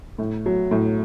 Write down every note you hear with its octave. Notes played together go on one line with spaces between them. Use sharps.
A2
F#3
A2